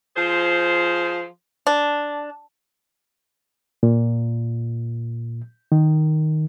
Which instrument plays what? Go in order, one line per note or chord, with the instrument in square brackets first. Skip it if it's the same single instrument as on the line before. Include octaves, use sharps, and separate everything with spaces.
[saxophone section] F3 G#4 C5
[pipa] D4
[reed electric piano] A#2
D#3